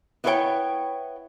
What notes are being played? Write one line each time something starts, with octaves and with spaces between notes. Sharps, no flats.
B3 E4 F4 C5 C#5 G5